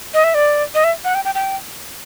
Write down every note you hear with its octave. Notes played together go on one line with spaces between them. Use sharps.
D#5
E5
D5
D#5
E5
F#5
G5
G5
G5